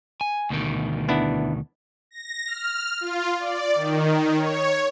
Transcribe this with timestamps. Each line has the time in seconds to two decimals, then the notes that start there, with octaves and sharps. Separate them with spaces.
0.21 G#5
0.50 D2 B2 D#3
1.09 B3 D4 E4
2.11 A#6
2.46 F6
3.01 F4
3.39 D5
3.75 D#3
4.37 C#5